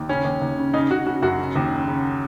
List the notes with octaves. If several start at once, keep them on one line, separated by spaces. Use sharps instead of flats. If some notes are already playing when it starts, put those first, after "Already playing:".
Already playing: D#2
C#3 C#4
D#2
D#2
C#3
C#3 D#4
C#3 F#4
C#3 F#4
F#2 F#4
C#3
D#2
C#3
C#3